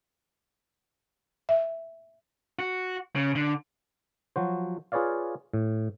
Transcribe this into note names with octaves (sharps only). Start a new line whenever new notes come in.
E5
F#4
C#3
D3
F3 F#3 F#4 C5
F4 G#4 B4 C#5 D5 F5
A2